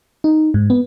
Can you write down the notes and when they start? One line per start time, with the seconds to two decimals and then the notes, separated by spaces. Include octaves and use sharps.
0.24 D#4
0.54 G#2
0.70 B3